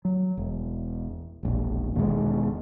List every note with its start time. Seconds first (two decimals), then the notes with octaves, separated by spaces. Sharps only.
0.05 F#3
0.37 E1
1.43 E1 A#1
1.95 E1 B2 D#3 G#3